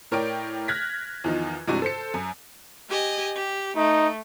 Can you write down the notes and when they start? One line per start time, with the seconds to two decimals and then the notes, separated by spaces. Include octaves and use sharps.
0.11 A2 A#4 C#5 D5 G5 D7
0.68 F6 F#6 G#6 A#6 B6
1.24 E2 D#3 F3
1.68 G2 C3 E3 G#3 D4 F#4
1.82 A4 C5 C#7
2.14 F#2
2.89 G4 D#5 G#5
3.35 G4
3.77 A3 D#4